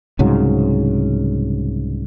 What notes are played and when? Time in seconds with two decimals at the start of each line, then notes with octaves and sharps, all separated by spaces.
0.19 C2 G#2 C#3 F#3